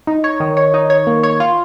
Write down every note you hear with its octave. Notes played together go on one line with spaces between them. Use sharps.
D#4
C#5
D#3
C#5
D#4
C#5
A#3
C#5
F4